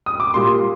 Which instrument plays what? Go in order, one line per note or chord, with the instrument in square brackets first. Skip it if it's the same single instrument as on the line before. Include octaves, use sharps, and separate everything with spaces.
[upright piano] D#6
D6
A#2 G3 A#3 C6